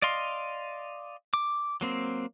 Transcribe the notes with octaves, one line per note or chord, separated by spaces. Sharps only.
D5 D#5 F5 C6
D6
F#3 A#3 C4